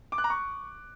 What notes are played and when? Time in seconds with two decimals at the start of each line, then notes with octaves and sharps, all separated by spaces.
0.12 D6
0.18 F#6
0.24 A#5
0.30 C#6